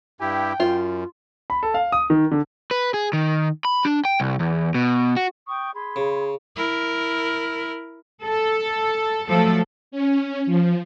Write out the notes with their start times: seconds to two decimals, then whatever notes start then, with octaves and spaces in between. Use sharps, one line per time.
0.21 G2 E4 G4 G5
0.60 F#2 F4
1.50 B5
1.63 A4
1.74 F5
1.92 D#6
2.10 D#3
2.32 D3
2.71 B4
2.94 G#4
3.13 D#3
3.65 B5
3.85 D4
4.05 G5
4.20 C2
4.40 E2
4.74 B2
5.17 F#4
5.48 G5 C#6 D#6
5.74 G#4 B5 C6
5.96 C#3
6.56 E4 A#4
8.24 A4
9.28 F3 F#3 A3 A4
9.91 C#4
10.46 F3